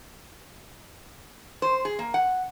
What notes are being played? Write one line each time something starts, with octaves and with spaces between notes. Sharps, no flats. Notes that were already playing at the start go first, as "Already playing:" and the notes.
C5
G#4
A#3
F#5